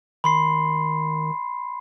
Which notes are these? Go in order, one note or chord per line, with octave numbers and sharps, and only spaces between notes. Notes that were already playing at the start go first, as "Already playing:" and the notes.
D#3 B5 C6 C7